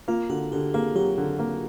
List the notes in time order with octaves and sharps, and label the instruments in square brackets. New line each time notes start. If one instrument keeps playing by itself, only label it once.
[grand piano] A#3 [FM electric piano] F4
[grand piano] D3 [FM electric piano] F#4
[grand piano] D3 [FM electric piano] G4
[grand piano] A#3 [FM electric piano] G#4
[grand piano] F#3 [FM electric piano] G4
[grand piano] D3
A#3